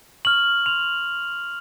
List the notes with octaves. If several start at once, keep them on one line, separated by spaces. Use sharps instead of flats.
C#6 F6 F#7
C6 F7